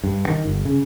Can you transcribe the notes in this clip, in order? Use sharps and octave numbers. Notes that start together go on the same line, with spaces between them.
G2
D#3
G1
C#3